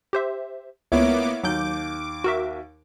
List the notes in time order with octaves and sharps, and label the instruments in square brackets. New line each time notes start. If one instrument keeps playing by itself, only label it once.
[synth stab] G4 C5 E5
[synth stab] C#2 [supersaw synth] A#3 B3 D6 [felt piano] E4 C#5
[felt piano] D#2 [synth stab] F#3 G6 [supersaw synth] D6
[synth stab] F#4 A#4 E5